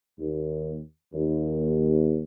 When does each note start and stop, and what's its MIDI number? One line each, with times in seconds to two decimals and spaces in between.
0.19 0.77 39
1.13 2.23 39